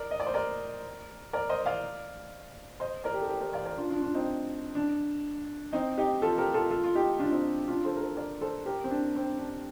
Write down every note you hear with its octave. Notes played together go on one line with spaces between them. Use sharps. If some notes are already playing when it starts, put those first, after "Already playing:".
Already playing: A#4 D5
D#5
D5
C5
A#4 D5
A#4 D5
C5 D#5
D5 F5
C5 D#5
A#4 D5
G4
A4
G4 A#4
G4 A#4
D5 F5
A#4 D5
D4 F4
D4 F4
D4 F4
C4 D#4
D4
C4 D#4
D#4 G4
F4 A4
G4 A#4
F4 A4
F4 A4
F4
D#4 G4
D4 F4
C4 D#4
D4 F4
A4 C5
A#4
A4 C5
A#4 D5
A4 C5
G4 A#4
C4
D4
C4
D4